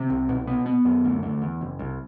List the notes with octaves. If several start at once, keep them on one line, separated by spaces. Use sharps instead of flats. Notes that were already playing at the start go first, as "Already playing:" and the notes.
Already playing: C3
C2
B2
B3
B3
F#2
D2
D2
E2
F#1
C2